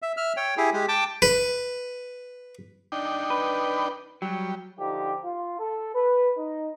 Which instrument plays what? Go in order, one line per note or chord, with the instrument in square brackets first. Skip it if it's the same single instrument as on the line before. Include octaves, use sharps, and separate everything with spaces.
[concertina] E5
E5 F6
C#5 G5
E4 G4 G#4
G#3 G4
G5 A5 D6
[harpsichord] B4
[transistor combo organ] D4 D#4 G5
[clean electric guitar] B4
[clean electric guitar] F#3 [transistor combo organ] G3
[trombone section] D3 F3 D#4 G4
F4
A4
B4
D#4